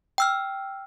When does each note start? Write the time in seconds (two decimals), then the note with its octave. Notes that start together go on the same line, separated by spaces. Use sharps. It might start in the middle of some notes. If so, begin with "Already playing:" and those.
0.18 G5 E6 F6